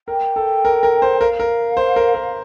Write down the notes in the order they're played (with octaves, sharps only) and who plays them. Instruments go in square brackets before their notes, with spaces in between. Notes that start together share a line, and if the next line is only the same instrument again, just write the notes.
[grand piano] A#4 [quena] G5
[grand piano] A4
A#4
A#4
C5
[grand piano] A#4 [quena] F5
[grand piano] A#4
C5
A#4
A#4